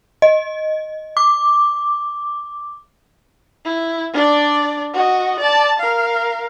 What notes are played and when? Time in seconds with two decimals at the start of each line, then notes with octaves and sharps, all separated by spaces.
0.22 D#5
1.17 D6
3.65 E4
4.13 D4 D5
4.93 F#4 D#5
5.39 D5 A5
5.79 A#4 F5